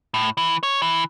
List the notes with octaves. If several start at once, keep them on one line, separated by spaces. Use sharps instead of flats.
A2
E3
C#5
E3